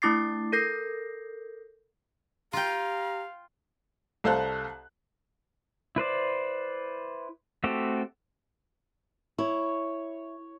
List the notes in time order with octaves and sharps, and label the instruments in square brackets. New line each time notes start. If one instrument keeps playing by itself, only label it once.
[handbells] A3 D4 E4 D6 A6 C7
A4 A#4 G6 A#6 C7
[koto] F4 G5 [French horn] G4 [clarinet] F5 [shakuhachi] A#5
[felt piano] C2 A4 C5 F5 A5 F#6
[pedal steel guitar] E4 B4 C5 D5
A3 C4 F#4 G4 A4
[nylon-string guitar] E4 [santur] C#5